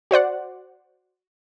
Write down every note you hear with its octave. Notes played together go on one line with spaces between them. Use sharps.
F#4 C5 D5 F#5